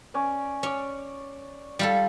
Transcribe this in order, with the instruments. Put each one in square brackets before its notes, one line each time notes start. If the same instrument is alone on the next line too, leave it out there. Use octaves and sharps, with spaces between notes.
[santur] C#4 D5
[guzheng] C#4 [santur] C#5 D5
[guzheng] G3 F4 A4